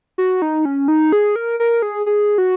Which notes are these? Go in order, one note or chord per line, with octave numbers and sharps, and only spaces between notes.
F#4
D#4
C#4
D#4
G#4
A#4
A#4
G#4
G#4
F#4